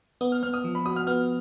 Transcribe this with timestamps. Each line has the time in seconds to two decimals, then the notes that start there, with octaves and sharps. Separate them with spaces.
0.21 B3 D#6
0.32 F6
0.43 B3 F6
0.54 D#6
0.64 F3
0.75 B5
0.86 F#4 D#6
0.96 F6
1.07 B3 F6